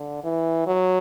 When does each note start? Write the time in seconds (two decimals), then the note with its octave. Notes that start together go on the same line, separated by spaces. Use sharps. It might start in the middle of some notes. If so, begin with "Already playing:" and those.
Already playing: D3
0.24 E3
0.67 F#3